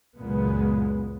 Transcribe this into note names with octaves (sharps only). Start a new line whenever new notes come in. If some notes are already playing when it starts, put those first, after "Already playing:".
C#2 F#2 A#2 C#3 G#3 B3